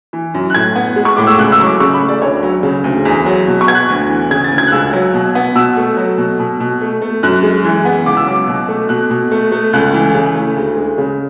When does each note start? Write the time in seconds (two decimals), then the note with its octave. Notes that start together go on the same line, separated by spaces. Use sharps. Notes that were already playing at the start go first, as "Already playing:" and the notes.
0.13 E3
0.34 F#2
0.50 F#6
0.54 A2 G#6
0.75 B3
0.96 G#3
1.05 C#6
1.16 A2 D6
1.27 E6
1.38 C#2 F#6
1.52 E6
1.60 F#3 C#6
1.67 D6
1.80 C#3 C#6
1.94 B5
2.02 A3
2.08 D5
2.22 D2 C#5
2.43 F#3
2.63 C#3
2.84 D2
3.05 E2
3.26 F#3
3.47 B2
3.61 C#6
3.68 B3 G#6
3.75 F#6
3.89 D2
4.09 E3
4.30 C#3 G#6
4.44 A6
4.51 D2
4.58 G#6
4.67 F#6
4.72 C#2 E6
4.93 F#3
5.14 B2
5.35 B3
5.55 B2 E6
5.77 A3
5.97 F#3
6.18 B2
6.39 B2
6.60 B2
6.81 A3
7.02 A3
7.23 F#2 F#6
7.43 G#3
7.64 E3
7.85 B3
8.06 C#2 D6
8.17 E6
8.27 F#3 D6
8.48 B2
8.68 A3
8.89 B2 F#6
9.11 B2
9.32 A3
9.52 A3
9.73 C#2 F#6
9.94 E3
10.15 C#3
10.35 A3
10.56 D2
10.77 G#3
10.98 C#3